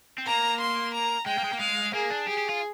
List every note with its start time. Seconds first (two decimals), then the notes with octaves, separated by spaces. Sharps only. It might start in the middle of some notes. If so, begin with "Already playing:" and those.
0.18 C4
0.26 A#3 A#5
0.60 C6
0.94 A#5
1.26 G#3 G5
1.38 A#3
1.44 G#3
1.53 A#3
1.60 G#3 F5
1.94 A#3 G#4
2.11 D4
2.27 G4 G#4
2.38 G4
2.50 F4